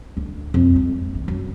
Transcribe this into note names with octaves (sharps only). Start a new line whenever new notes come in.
D2
F2
G#3
D#3
F#2